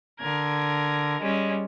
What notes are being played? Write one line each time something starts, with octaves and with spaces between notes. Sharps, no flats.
D3 A#4 G#6
G3 G#3 C#4